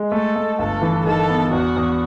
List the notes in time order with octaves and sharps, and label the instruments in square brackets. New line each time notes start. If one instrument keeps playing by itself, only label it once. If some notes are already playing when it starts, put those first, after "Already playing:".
Already playing: [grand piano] G#3
[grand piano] A3 [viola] A4
[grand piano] A3
[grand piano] G1 [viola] A4
[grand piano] E3
[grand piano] D#3 [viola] A4
[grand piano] B3
[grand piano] E2 [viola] F#4
[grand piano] E2